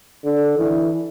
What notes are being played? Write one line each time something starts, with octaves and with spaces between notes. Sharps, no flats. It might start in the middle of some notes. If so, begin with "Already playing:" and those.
D3
E3